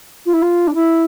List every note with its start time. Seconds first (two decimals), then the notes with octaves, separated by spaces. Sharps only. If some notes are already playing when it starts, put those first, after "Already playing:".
0.25 F4
0.33 E4
0.41 F4
0.67 D4
0.74 E4